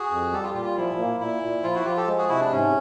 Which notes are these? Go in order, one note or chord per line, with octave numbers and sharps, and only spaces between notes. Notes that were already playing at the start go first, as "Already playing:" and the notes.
Already playing: F#4 G#4
F2
G3 G4 A4
F4 G4
A#2 F4 G4
F4
F3 E4
A#3
A#2 E4
A#2
F3 F4
E4 F#4
F3 F4 G4
G4 A4
G#3
F#4 G#4
C3 E4 F#4
D4
G#2 C#4